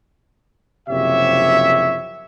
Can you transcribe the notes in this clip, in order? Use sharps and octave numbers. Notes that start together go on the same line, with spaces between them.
F#1 C3 F3 G4 C#5 E5